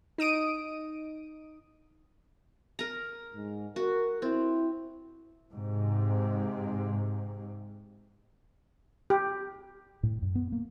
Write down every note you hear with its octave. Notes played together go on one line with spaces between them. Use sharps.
D#4 D#6 D7 D#7
A#4 A#5
G#2
F#4 A#4
C4 E4
G#2 C3
G4
A2
F#2
B3
A#3